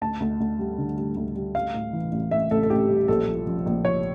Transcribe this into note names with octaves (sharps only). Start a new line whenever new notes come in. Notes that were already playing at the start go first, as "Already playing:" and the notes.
D2 A5
D2
D2
G3
D3
G3
D2
G3
G3 F5
A2
E3
A1
A2 E5
A1 A4
A4
A1 G4
G3
A#1 A4
F3
F3
A#1
F3 C#5